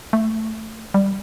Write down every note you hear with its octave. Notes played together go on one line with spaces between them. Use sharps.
A3
G3